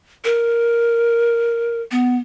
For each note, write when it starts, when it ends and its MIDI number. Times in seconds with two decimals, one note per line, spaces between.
0.25 1.81 70
1.91 2.16 59